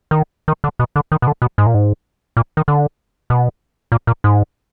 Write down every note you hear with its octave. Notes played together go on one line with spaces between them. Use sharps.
D#3
D#3
D3
B2
D3
D#3
B2
D3
B2
G#2
A#2
G#2
A#2
D#3
D3
B2
A#2
A#2
G#2